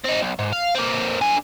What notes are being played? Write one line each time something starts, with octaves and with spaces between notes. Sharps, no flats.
C4 D#4
B1
G#2
F5
A#3 C4
D3 G#5